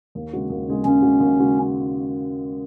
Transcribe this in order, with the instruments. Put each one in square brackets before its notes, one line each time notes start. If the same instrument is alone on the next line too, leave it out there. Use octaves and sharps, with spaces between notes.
[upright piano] D#2
C#3 G#3 F#4
D#2
C#3 G#3 F#4
[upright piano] D#2 [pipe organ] C#4
[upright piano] C#3 G#3 F#4
D#2
C#3 G#3 F#4